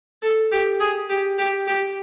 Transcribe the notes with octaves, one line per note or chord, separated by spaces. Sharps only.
A4
G4
G#4
G4
G4
G4